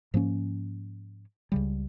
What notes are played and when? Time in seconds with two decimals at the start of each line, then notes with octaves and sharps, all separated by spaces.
0.14 G#2 F3 A#3 C#4
1.52 C#2 C#3 G3